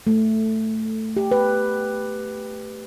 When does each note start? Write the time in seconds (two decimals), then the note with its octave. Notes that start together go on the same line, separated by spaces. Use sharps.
0.07 A3
1.17 G4
1.31 B4